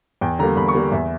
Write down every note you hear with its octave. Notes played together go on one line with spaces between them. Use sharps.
E2 G5
D3 G3 A#3 A#5
E2 B5
C#6
D3 G3 A#3
E2 E5